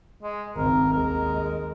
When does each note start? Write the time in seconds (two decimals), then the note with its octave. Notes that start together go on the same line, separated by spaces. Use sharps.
0.23 G#3
0.56 G#1 C#2 A#4
0.92 D#2 G#3 A#4